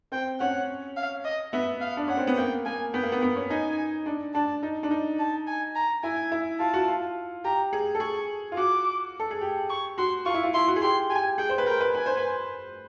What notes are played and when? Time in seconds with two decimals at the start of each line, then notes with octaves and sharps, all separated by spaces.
0.12 C4 G5
0.40 C#4 F#5
0.97 F5
1.25 D#5
1.53 B3 E5
1.81 F5
1.97 D4
2.08 C#4 F#5
2.17 C4
2.27 B3
2.38 A#3 G5
2.65 A#3 G#5
2.94 B3 G5
3.03 A#3
3.12 B3
3.22 B3
3.36 C#4
3.50 D#4 G#5
4.06 D4
4.34 D4 A5
4.63 D#4
4.83 D4
4.91 D#4
5.19 A5
5.47 G#5
5.75 A#5
6.03 E4 G#5
6.32 E4
6.60 F4 A5
6.74 F#4
6.88 F4
7.44 G4 A#5
7.73 G#4
7.95 A4
8.00 G#4 C#6
8.52 F4
8.57 F#4 D6
9.20 A4
9.31 G#4
9.41 G4
9.70 C#6
9.98 F#4 C6
10.26 F4 C#6
10.34 E4
10.43 F4
10.54 E4 C6
10.68 F#4
10.76 G#4
10.82 G4 C6
11.10 G4 G#5
11.38 G#4 G5
11.50 C5
11.58 B4
11.66 A#4 G5
11.81 B4
11.95 B4 G#5
12.06 C5
12.17 B4